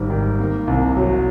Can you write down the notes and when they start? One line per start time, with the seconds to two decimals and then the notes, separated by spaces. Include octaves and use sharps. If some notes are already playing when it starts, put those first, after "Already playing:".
Already playing: G#1 G3
0.10 D#3
0.39 A#3
0.67 C2
0.97 F#3